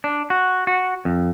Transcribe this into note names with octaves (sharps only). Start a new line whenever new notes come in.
D4
F#4
F#4
F2